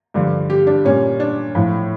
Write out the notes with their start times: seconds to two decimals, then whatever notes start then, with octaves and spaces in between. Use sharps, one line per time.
0.14 G2 D3 F3
0.50 G4
0.67 D4
0.85 A#2 G3 C#4
1.20 D4
1.55 A2 F3